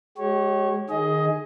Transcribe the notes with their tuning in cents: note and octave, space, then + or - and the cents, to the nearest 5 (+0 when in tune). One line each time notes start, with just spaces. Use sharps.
G#3 +0 G4 -40 C#5 -15
D#3 -25 G#4 +0 D#5 +15